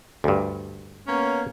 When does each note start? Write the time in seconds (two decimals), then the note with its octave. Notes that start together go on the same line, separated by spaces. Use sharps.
0.24 D2 G2
1.08 A#3 B3 C#4